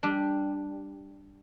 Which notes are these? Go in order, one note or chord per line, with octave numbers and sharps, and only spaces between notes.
G3 D4 G4